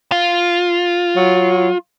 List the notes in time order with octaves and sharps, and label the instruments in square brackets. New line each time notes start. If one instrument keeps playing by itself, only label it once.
[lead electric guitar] F4
[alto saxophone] F#3